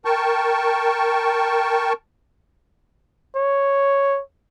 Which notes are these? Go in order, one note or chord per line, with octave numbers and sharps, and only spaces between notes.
A#4 G5 A5 C#6
C#5